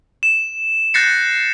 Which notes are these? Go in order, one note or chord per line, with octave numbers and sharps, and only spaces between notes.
E7
F#6 G6 A6 A#6 C7 C#7